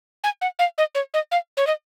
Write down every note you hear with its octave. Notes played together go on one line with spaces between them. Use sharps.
G#5
F#5
F5
D#5
C#5
D#5
F5
C#5
D#5